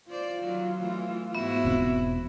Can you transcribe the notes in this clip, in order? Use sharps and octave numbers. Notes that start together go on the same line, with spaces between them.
F4 C5 D5
D#3 F#3
E3 A3
G#2 B3 E4 F#4 E5
E1 B2 C4